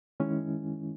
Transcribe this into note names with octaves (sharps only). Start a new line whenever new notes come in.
D#3 G#3 C#4 E4